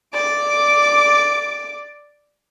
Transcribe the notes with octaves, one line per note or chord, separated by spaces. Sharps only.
D5 D6